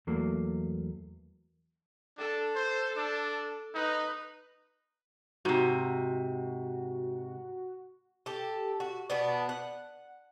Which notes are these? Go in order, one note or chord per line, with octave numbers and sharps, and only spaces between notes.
E2 F#3 A3 A#3
D4 A4
C5
D4
D#4 B4
G#2 C3 F#4
G4 A4
F#4
B2 B3 D4
F#5